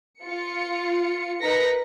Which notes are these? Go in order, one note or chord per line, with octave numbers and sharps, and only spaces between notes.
F4 C#7
D#4 A#4 B4 A#6 B6 C#7